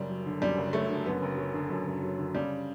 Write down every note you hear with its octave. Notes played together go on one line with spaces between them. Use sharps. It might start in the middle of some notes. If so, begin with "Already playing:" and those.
Already playing: F#1 F#2 G3
F#3
D3
F#2 G3
F#1
F#3 A3
D3
F#2 B3
F#1
F#3
D3
F#2
F#1
F#3
D3
C#3 G3